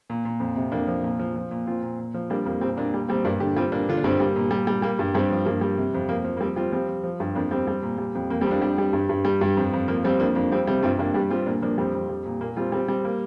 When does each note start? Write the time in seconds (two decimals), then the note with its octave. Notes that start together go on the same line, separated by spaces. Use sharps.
0.10 A#2
0.25 A#2
0.40 F2
0.56 C3
0.72 F2 A#3 D4
0.88 F3
1.03 A#2
1.19 F3
1.36 F3
1.51 A#2
1.66 A#2 C4 F4
1.82 A#2
1.99 A#2
2.14 F3
2.30 G3 A#3 D4
2.46 F2 A#3
2.61 A#2 G3 C4
2.77 A#2 A#3 D4
2.94 G3
3.08 A#2 G3 C4
3.25 G2 A#3 D4
3.40 D3 D4 G4
3.56 G3 C4 F4
3.72 A#2 A#3 D4
3.89 D3 F4
3.97 D4
4.04 G2 G3 C4
4.19 G3 A#3
4.36 A#2
4.51 G3
4.67 G3
4.82 G3 A#3
4.99 G2
5.14 G2 G3 C4
5.31 F3
5.46 G2 A#3
5.61 G3
5.78 C3
5.94 F2
6.09 F3 A#3
6.24 F3
6.37 A#3
6.41 G3 C4
6.56 G3 C4 F4
6.72 F3 G3 C4
6.89 F3
7.03 F3
7.20 G2
7.35 F2 A#3 D4
7.51 G3 C4
7.67 G3
7.82 A#2
7.98 G3
8.15 F2
8.30 F2 A#3
8.41 G3 C4
8.46 F2 A#3 D4
8.61 G3 D4 G4
8.78 G3
8.93 G2
9.09 G2
9.25 G3
9.41 G2
9.57 F2
9.73 F2
9.88 F3 A#3
10.04 F3 G3 C4
10.20 F2 A#3 D4
10.35 F2 A#3 D4
10.51 F2 G3 C4
10.67 C3 G3 C4
10.83 G2 C4 F4
10.99 G2 A#3 D4
11.14 G3 D4 G4
11.30 G3 C4 F4
11.46 A#2 A#3 D4
11.62 F3 A#3 D4
11.78 F2 G3 C4
11.94 F2
12.09 G3
12.26 A#2
12.41 A#2 A#3
12.57 G3 C4 F4
12.72 G3 C4 F4
12.88 G3 C4
13.04 A#3